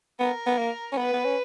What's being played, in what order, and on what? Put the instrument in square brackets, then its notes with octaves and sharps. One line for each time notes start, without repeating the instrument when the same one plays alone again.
[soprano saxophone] B3 [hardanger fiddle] A#4
[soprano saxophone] B3
A#3
C#4
[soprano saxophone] B3 [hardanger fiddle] B4
[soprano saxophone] B3
C#4